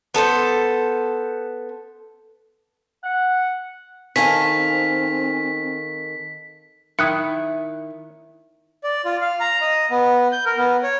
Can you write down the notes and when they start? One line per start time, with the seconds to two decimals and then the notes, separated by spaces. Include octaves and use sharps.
0.14 B3 A4 B4 C5
3.04 F#5
4.16 D#3 C4 A4 F5 G#5 B6
6.99 D#3 E4 D#6 F#6 C#7
8.84 D5
9.05 F4
9.21 F5
9.40 A#5
9.61 D#5
9.91 B3
10.32 G6
10.46 A#4
10.58 B3
10.83 C#5